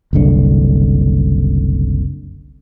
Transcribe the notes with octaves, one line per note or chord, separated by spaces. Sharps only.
F#1 C2 D3